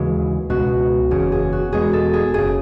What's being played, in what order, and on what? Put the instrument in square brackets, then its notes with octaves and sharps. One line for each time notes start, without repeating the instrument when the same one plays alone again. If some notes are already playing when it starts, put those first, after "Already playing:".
Already playing: [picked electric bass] D#2 C#3 E3 G#3 [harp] F#4
[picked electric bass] C#2 B2 G#3 [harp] F#4
[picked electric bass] F#1 E2 C#3 [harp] G#4
[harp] G#4
F#4
[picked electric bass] E1 E2 B2 G#3 [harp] G#4
[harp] A4
G#4
[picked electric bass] F#1 C#3 [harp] G#4